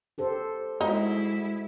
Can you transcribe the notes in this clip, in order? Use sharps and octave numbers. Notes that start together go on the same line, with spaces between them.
G4 A4 C5
G#3 D#4 E4 F#4